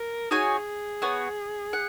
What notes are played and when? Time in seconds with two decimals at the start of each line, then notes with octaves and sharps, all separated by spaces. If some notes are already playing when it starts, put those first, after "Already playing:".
Already playing: A#4
0.31 D#4 F#4 G#4 C#5 G#5
1.02 B3 F#4 C#5
1.73 F#5